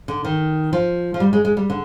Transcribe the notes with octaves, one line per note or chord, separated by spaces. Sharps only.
D3
D#3
F3
F3
G3
G#3
G#3
G3
D3